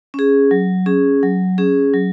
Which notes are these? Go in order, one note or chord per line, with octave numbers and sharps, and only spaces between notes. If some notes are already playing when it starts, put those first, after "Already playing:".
C#4 G#4
F#3
C#4 G#4
F#3
C#4 G#4
F#3